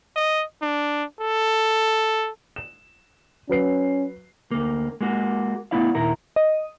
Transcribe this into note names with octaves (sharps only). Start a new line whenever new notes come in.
D#5
D4
A4
E7
F#3 C#4 B4 C7
D2 A#3
G#3 A#3 F#4
A3 B3 E4 D5 F5
D#2 A#2 E4 A#4
D#5